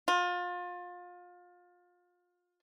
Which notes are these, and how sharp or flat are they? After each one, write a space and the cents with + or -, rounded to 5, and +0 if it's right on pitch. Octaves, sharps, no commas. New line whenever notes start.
F4 +30